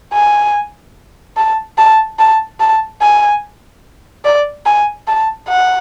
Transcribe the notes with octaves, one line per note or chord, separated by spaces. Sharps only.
G#5
A5
A5
A5
A5
G#5
D5
G#5
A5
F#5